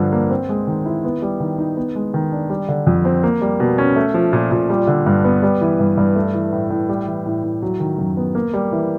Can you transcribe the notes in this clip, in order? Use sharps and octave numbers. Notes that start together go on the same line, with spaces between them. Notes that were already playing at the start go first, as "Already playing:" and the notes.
Already playing: G2 D3 F3
A#3
C4
G#3
D#3
E4
B3
G3
D#3
D#4
B3
G#3
D#3
D4
G3
D3
F2
C4
A#3
G3
B2
C#4
A3
F3
A#2
A#2
G3
D3
G2
B3
G3
E3
G2
G2
A3
E3
A2
A2
G3
E3
A2
A2
F#3
D#3
F#2
B3
A#3
G3
E3